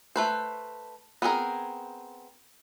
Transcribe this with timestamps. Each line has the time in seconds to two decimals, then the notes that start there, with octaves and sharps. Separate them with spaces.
0.16 A3 B4 C5
1.22 B3 C4 G#4 A#4